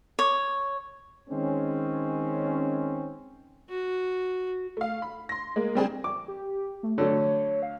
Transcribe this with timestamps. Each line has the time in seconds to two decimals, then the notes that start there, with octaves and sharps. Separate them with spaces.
0.19 C#5
1.29 D#3 G#3 C4 C#4
3.70 F#4
4.77 A3 F5
5.02 B5
5.29 C6 A#6
5.56 G#3 A#3
5.75 G3 A3 C4 D4 G#4
6.04 D6
6.28 G4
6.83 A3
6.98 D3 F#3 A3 C#5
7.63 F5